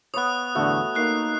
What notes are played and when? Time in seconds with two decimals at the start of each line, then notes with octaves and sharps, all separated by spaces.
0.14 B3 C#5 D#6 F#6
0.55 E2 A2 D3 A3 F#4
0.95 A#3 D#4 F#6 C7